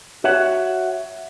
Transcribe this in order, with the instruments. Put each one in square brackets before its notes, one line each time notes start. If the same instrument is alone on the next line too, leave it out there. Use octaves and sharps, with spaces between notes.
[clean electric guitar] F#4 C#5 E5 F#5